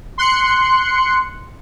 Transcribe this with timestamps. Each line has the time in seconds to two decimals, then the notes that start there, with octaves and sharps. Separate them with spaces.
0.18 C6 F#6 C#7